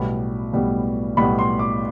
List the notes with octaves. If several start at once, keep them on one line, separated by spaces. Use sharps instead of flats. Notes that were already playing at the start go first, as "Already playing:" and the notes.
Already playing: B1 A2 G3 B3 B5
B1 A2 G3 B3
B1 A2 G3 B3 B5
C6
D6